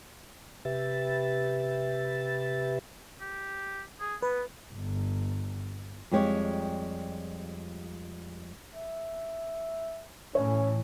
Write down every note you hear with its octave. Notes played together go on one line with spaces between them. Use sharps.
C3 G4 B4 E5 A6
G4
G#4
B3 B4
G1
F2 G3 G#3 G4 C#5
E5
A2 E3 C#4 C#5